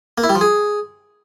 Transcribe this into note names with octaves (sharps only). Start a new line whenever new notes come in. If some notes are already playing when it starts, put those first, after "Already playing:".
A#3
E4
G3
F3
G#4